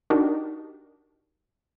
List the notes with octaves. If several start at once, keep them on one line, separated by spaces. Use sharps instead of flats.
D4 D#4 F#4 G4 A#4